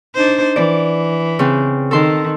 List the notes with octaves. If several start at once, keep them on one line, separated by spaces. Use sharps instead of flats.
D4 D#4 C5
E3 D5
C#3 C4
D#3 A4 C6